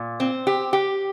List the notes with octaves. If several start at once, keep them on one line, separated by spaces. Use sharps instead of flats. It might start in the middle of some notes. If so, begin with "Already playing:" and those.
Already playing: A#2
C4
G4
G4